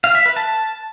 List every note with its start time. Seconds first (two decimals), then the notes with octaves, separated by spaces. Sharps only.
0.04 F5
0.15 E5
0.26 B4
0.36 A5